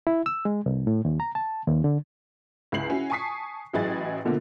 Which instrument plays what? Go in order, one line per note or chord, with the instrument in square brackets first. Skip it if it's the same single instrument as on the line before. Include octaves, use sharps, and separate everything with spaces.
[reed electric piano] E4
E6
G#3
C2
A2
D#2
A#5
A5
D#2
D3
[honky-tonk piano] C#2 C#3 E4 C7 F#7
C#4 E4 F#4
G#5 A5 C#6 D#6 B6 C7
A1 F#3 E4 G#4 D#5 A6
B2 D3 F3 A3 A#3